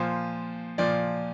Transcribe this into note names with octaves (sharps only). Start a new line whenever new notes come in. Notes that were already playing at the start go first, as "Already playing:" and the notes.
Already playing: A#2 F3 C5
A#2 F3 D5